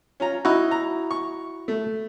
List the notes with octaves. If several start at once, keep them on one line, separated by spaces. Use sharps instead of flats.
C#4 F4 A#5
D#4 E4 F#4
A#5
C#6
A3